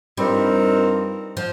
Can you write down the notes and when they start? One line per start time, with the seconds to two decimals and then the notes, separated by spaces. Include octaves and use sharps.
0.17 G2 F3 G3 C4 D#4 A#4
1.37 F3